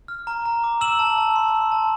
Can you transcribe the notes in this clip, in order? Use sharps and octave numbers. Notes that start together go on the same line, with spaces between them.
F6
A#5
A#5
D6
E6 E7 F#7
A5
A5
C6
E6
A5